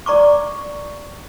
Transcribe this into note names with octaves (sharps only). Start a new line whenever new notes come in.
D5 A#5 C#6 D6